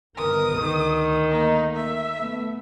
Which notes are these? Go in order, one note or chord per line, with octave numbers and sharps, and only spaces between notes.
G1 D#3 B3 A#4 D#6
D2 D#3
A3 A#3 D#4
E5
A3 B3